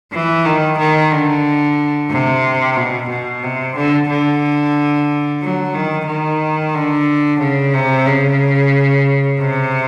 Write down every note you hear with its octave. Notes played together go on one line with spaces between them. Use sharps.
E3
D#3
D#3
D3
C3
B2
B2
C3
D3
D3
F#3
D#3
D#3
D3
C#3
C3
C#3
C3